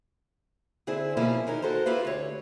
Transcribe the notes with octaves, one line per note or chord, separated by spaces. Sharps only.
D3 C4 E4 G#4 E5
B2 F3 A#3 C#4 E4 G#4
D#3 E3 C#4 D#4 A#4
F#4 A4 A#4 C5
E4 F4 G4 B4 F5
D2 C#5